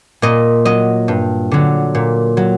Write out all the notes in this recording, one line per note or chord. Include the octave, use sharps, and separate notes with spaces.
A#2 D#5
F#3 D#5
G2
D3 F#3
A#2
F#3